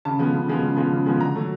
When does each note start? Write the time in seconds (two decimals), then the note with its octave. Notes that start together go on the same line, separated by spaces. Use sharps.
0.05 C#3 A5
0.19 F3 G#3 B3
0.34 C#3
0.48 F3 G#3 B3
0.63 C#3
0.76 F3 G#3 B3
0.92 C#3
1.06 F3 G#3 B3
1.20 D3 A#5
1.35 F#3 A3